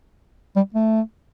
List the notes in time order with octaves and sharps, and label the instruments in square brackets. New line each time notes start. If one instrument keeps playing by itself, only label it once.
[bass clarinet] G3
A3